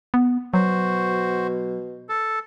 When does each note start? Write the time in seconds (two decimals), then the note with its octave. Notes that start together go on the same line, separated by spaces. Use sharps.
0.14 B3
0.54 B2 F#3 F#4 C5
2.09 A4